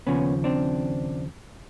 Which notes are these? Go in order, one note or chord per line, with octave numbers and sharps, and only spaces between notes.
D#2 C#3 F3 B3 C#4
C4 D4